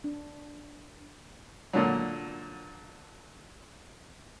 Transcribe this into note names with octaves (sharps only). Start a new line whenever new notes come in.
D4
A#2 D3 F#3